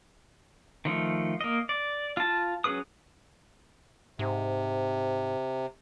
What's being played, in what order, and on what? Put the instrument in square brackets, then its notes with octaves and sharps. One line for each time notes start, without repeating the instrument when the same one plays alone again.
[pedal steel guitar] D#3 F3 A3
A#3 D#5
D5
F4 A5
F#3 C#4 G#4 B4 D#6
[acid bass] G#2 [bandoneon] C3